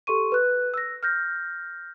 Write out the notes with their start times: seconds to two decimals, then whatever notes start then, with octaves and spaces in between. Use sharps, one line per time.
0.07 G4 A4 C6 C#6 D#7
0.32 B4 F#6
0.74 E6 A#6
1.03 F6 G6 A#6